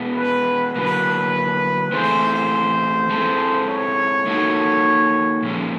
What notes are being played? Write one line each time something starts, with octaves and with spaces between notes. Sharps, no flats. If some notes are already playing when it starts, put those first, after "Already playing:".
Already playing: B2 G#3 B3
B4
D3 F#3 A#3 B4
E3 A3 C4 E4 G#4 C5
G#3 C4 E4 A4
C#5
A#3 D#4 F#4 A4
A#2 F3 G#3 C#4